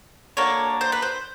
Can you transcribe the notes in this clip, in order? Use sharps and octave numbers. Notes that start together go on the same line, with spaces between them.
A#3 D4 F#4 A4 C#5
C5
B4
C5